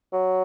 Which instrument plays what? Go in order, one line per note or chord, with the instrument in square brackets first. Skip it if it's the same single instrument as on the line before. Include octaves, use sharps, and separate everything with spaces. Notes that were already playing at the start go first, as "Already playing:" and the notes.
[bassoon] F#3